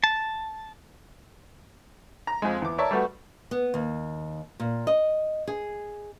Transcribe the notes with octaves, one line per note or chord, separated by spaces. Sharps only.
A5
A#5
F2 G#3
E2 D6
A#4 C#5 D5 E5 A5
G3 A3 B3 F#4
B3
D#2
A#2
D#5
G#4